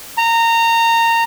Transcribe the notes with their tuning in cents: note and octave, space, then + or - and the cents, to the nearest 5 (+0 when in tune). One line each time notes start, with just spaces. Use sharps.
A#5 -20